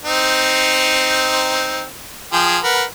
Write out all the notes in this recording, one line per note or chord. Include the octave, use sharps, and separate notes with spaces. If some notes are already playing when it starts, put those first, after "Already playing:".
C4 D#4
F3 G#4 G5
A#4 B4 F#5